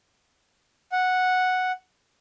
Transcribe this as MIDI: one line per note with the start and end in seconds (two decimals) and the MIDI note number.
0.92 1.72 78